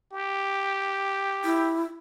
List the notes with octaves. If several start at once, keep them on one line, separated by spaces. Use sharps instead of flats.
G4
E4